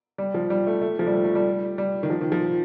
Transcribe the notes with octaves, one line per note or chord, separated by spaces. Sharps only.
G3
F3
G3
A3
A3
F3
G3
A3
A3
G3
G3
D#3
F3
D#3
F3